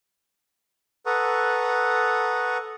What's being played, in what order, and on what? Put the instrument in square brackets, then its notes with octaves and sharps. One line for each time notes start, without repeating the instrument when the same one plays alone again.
[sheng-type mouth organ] A4 B4 F#5 A#5 C#6 D#6